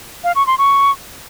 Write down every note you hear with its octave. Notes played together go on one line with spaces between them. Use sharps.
F5
C#6
C6
C#6